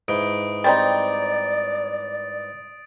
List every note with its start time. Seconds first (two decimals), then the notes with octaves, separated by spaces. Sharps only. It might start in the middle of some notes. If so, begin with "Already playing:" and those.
0.08 G#2 E3 D#6 D7
0.64 G3 C4 D#4 D5 A6